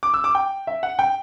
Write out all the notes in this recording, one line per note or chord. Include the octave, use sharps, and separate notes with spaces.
D6
E6
D6
G5
E5
F#5
G5